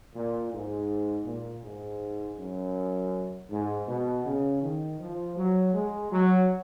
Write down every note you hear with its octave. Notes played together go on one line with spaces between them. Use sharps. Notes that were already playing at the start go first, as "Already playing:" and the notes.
A#2
G#2
A#2
G#2
F#2
G#2
B2
C#3
D#3
F3
F#3
G#3
F#3